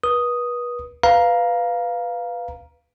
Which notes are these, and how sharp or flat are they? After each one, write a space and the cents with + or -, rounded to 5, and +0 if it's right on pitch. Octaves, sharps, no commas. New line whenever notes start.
B4 -35 D#6 +0
B4 +0 F5 +0 A#5 +15